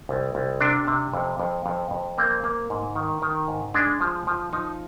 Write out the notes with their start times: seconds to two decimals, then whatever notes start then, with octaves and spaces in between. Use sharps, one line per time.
0.09 C2
0.35 C2
0.61 C3 D4
0.87 C3
1.13 F2
1.40 F2
1.66 F2
1.91 F2
2.18 A#3 C4
2.44 A#3
2.70 G#2
2.95 D#3
3.22 D#3
3.48 G#2
3.74 G#3 D4
4.01 F3
4.27 F3
4.53 F3 D#4